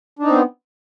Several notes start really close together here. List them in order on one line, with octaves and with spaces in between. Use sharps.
D4 D#4 C4 B3